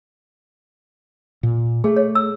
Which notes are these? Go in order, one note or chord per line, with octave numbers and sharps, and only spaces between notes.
A#2
A3 G#4
C#5
E6